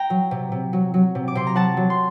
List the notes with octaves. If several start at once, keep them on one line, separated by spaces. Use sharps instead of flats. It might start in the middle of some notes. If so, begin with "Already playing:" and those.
Already playing: G5 A#5
F#3
C3
C3
F#3
F#3
C3
D6
C3 C6
A#5
F#3 F#5 A5
F#3
C6